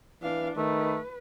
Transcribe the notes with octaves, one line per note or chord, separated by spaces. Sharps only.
E3 D4 F5
D#3 A3 B4